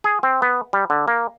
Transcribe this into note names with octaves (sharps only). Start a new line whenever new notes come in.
G#4
C4
B3
G3
D3
A#3